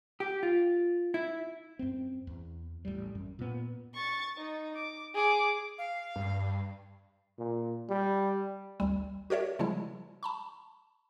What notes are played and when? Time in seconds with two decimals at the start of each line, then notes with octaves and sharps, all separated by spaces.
0.20 G4
0.43 F4
1.14 E4
1.79 F#2 C4
2.27 E2
2.85 A1 G3
3.15 F#2
3.39 A#2 B3
3.94 C#6 A6
4.37 D#4
4.75 D6
5.14 G#4 D6
5.78 F5
6.16 G2
7.38 A#2
7.89 G3
8.80 G#1 D2 G3
9.30 F#4 G4 A#4 C#5 D5 E5
9.59 C#3 F3 G3 G#3 E4
10.23 A5 B5 C#6